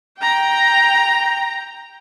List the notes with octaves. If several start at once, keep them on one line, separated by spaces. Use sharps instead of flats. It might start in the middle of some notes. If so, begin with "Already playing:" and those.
G5 A#5